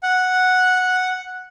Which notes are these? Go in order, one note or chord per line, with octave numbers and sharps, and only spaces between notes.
F#5